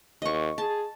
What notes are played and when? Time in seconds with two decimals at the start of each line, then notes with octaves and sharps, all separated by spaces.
0.22 D#2 D#5 C#6
0.58 G#4 A5